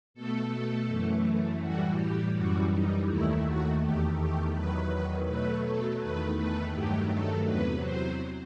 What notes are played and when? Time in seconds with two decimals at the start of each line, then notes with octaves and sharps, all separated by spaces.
0.14 B2 A3 A4
0.87 F#2 E3 A3
1.60 A2 E3 G3 F#4
1.97 G4
2.33 F#2 E3 G3 F#4
2.70 D#4
3.07 D#2 D#3 A3 E4
3.43 F#4
3.79 E2 D#3 A3 G4
4.16 G4
4.52 E2 D#3 F#3 B4
5.26 B2 F#3 A3 B4
5.62 A4
5.99 E2 D#3 A3 B4
6.36 B4
6.72 G2 D#3 F#3 A3 G4
7.09 A4
7.45 E2 C3 F#3 B4
7.82 C5